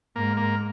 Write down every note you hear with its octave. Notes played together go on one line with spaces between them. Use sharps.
G#2 A#3
A#3